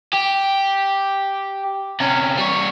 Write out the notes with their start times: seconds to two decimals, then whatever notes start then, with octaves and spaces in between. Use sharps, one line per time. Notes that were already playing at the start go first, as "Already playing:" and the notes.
0.13 G4
2.00 C3 C#4
2.37 G3 C#5